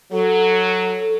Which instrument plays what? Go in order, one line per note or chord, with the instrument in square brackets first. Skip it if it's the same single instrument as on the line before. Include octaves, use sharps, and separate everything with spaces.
[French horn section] F#3 [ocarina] A4